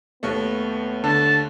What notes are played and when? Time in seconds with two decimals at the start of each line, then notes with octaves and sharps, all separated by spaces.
0.23 D#2 A3 B3
1.04 D3 A5